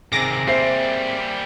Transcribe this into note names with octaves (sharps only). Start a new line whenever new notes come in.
C3 D#3 C4 G#4 D6 A#6
G3 A#3 C5 E5 C7